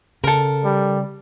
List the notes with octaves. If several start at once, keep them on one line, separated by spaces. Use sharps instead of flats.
C#3 A4 A#4
G3